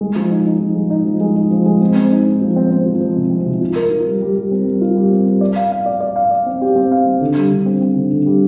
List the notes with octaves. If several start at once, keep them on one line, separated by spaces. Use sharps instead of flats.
G#3
F3
D#4
D#4
F3
G#3
D#4
F3
G#3
D#4
F3
G#3
C4
C4
D#4
D#4
F3
C4
C4
F3
F3
C3
C4
C3
F4
A#4
F4
G3
G3
G3
C4
G3
F4
G3
C4
G3
D5
F5
F5
D5
D5
F5
D5
C4
G4
C4
F5
C4
D3
G3
D3
C4
C4
D3
D3
G3